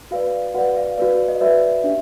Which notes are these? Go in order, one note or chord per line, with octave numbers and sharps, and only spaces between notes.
F#4 B4 D5 F5
F#4 B4 D5 F#5
F5
F#4 B4 D5
D#5
F#4 B4 D5 E5
D4 G4 E5